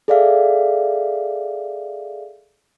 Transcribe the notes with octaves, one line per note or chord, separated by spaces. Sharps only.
G#4 A4 D5 E5 F5